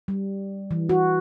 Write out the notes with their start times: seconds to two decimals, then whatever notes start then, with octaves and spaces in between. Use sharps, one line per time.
0.08 G3
0.71 E3
0.89 F#4